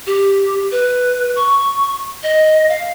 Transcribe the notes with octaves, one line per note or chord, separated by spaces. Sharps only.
G4
B4
C#6
D#5
F5